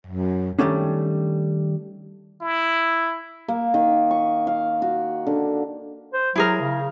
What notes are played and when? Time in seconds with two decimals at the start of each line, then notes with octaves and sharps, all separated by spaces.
0.07 F#2
0.59 D#3 F3 G3 A3 C#4 D4
2.41 E4
3.48 A#3
3.74 D#3
4.11 C#6
4.47 F5
4.82 F#4
5.27 D3
6.13 C5
6.36 F#3 E4 G#4 A#4
6.61 C#3